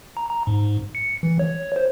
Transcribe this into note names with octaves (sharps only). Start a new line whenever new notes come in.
A#5
A#5
G#2
C#7
E3
C#5
C5